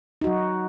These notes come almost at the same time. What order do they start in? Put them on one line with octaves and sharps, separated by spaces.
D#4 F#4 F#3